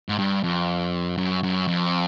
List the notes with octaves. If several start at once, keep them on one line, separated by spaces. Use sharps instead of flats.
G#2
G2
F2
F#2
F#2
F2